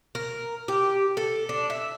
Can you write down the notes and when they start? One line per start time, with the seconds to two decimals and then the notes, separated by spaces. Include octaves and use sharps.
0.15 A#4
0.68 G4
1.17 A4
1.49 D4
1.70 E5